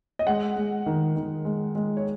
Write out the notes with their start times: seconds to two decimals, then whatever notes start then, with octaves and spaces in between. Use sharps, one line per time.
0.19 D#5
0.27 G#3 F#5
0.56 G#3
0.86 D#3
1.16 D#3
1.45 G#3
1.75 G#3
1.97 C#5